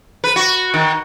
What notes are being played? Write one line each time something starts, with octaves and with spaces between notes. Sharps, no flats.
B4
F#4
D#3